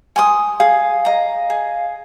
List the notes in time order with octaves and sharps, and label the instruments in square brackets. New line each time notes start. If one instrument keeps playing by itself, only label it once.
[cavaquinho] G#5 C6 D#6
[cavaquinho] G#4 [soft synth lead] F5
[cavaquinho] D#5 A#5
G#4